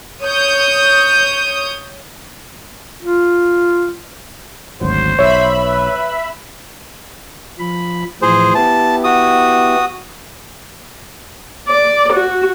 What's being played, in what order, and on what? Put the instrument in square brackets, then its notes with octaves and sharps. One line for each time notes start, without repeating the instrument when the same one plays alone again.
[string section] C#5 D#6 G6
[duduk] F4
[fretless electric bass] G#1 D2 F#3 [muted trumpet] C5
[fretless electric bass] B1 [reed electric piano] C#5 [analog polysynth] E5 B5
[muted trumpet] B4
[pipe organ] F3 B5
[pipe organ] A2 E3 F3 [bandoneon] G#4 C5
[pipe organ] B3 E4 G4 [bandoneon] A5
[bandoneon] F#4 D#6
[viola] D5
F#4